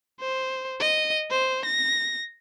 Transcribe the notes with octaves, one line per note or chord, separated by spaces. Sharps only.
C5
D#5
C5
A#6